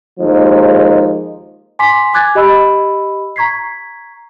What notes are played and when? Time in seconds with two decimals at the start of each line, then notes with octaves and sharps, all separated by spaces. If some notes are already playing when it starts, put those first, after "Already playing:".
0.19 D#2 F3 G#3 D#4
1.79 G#5 C6 D6 B6
2.14 G#5 D6 F#6 G#6 A6
2.35 G4 D#5 B5 E6
3.36 A#5 C#6 G#6 B6 C7